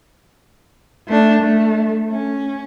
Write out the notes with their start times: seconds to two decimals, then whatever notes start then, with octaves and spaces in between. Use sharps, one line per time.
1.08 A3 D4
1.42 A3
2.11 C#4